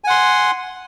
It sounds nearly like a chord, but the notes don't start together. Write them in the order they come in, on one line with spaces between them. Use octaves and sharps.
G#5 F#5 C6